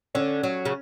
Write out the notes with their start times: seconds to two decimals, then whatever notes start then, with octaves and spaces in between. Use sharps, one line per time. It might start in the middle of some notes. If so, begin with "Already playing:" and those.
0.15 D3 C#4
0.43 F#3
0.65 C#3